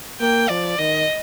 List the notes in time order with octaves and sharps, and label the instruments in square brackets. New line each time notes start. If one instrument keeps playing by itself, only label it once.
[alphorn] A#3 [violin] G5
[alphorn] F3 [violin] D5
[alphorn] D#3 [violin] D#5